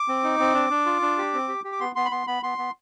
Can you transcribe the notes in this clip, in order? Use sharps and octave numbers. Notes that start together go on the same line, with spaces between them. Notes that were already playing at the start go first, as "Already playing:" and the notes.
Already playing: D6
C4
D#4
C4
D4
D4
F4
D4
G4
C4
G4
G4
D6
B3 C6
B3 C6
B5
B3 C6
B3 B5
B3 C6
B3